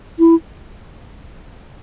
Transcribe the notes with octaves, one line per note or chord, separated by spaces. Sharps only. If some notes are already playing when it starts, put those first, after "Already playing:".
E4